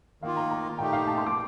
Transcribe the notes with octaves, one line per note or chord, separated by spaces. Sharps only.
D#3 A#3 F4 F5
A#5
A#5
A#2 A3 D#4 G4 G5
F5
A5
C6
D6